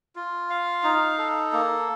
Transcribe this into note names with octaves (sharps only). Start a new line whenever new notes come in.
F4
F5
D#4
A4
A#3